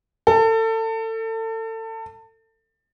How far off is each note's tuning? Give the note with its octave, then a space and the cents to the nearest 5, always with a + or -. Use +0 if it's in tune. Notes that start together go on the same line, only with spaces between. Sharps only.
A4 +30